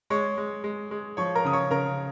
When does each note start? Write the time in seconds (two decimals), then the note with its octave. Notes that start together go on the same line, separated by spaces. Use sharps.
0.10 G#3 C#5 C#6
0.38 G#3
0.64 G#3
0.91 G#3
1.17 F3 C#5 C#6
1.35 A#4 A#5
1.45 C#3 D#6
1.53 C#5 C#6
1.71 C#3 A#4 A#5